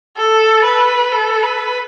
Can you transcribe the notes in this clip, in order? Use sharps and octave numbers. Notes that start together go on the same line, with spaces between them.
A4
B4
A4
B4